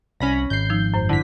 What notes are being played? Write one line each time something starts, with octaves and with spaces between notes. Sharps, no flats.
C2 C#4 B5 A#6
G#1 G6 C7
F3 D#4 E6
F#2 C5
D3 E4 A5 B6